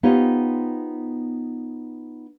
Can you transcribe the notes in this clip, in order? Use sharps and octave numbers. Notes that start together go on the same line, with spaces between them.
B3 D#4 F4 G4 C5 C#5